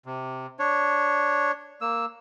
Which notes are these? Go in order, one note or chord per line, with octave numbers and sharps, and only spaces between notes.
C3
D4 C#5
A#3 E6